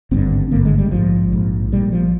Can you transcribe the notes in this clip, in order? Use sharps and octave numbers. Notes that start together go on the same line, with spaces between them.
G#1 G2 D3 C4
G#1 G2 D3 A#3
G#3
G3
A#1 G#2 F3
A#1 G#2
A#1 A#2 G3
F3